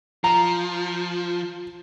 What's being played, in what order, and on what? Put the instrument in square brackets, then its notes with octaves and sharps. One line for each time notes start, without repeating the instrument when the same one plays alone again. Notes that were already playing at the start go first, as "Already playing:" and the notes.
[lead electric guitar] F3 [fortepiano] A#5